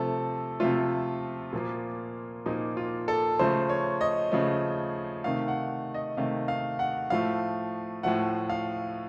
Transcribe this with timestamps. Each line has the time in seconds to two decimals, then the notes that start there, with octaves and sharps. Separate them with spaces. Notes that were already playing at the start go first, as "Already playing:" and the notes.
Already playing: C3 F3 A3 A4
0.60 C3 F3 A3 F4
1.53 A#2 F3 A#3
2.46 A#2 F3 A#3 D#4
2.77 F4
3.08 A4
3.39 C#3 F3 A3 C5
3.69 C#5
4.01 D#5
4.32 C#3 F3 A3
5.24 C3 D#3 A3 F5
5.48 F#5
5.94 D#5
6.17 C3 D#3 A3 F5
6.48 F5
6.79 F#5
7.10 A2 F3 A3 F5
8.03 A2 F3 A3 F#5
8.49 F5